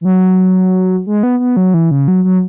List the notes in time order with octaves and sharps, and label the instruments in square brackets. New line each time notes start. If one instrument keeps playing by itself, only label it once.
[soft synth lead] E3
F#3
G#3
B3
B3
F#3
E3
C#3
F#3
F#3